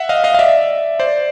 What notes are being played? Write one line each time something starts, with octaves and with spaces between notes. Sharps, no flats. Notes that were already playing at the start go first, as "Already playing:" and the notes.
Already playing: E5 F#5
D#5 F5
D#5 F5
F5
D5 E5
C5 D5